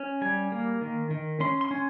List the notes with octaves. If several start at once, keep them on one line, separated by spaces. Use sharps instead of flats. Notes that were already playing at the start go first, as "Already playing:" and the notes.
Already playing: C#4
G3 G#5
A#3
D#3
D#3
C#4 C6
C6
C#4